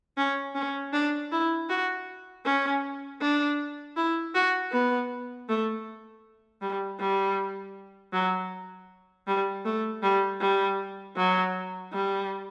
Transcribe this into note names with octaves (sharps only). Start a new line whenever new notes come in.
C#4
C#4
D4
E4
F#4
C#4
D4
E4
F#4
B3
A3
G3
G3
F#3
G3
A3
G3
G3
F#3
G3